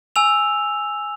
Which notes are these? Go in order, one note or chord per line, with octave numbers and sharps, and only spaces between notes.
G#5 E6 F7